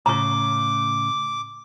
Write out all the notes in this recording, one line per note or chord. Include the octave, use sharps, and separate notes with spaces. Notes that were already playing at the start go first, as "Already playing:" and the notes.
A2 C#3 A#5 C#6 D6